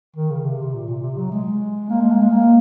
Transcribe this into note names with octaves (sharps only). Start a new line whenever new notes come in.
D#3
C#3
C3
C3
A#2
A#2
C3
F#3
G#3
A#3
G#3
A#3
G#3
A#3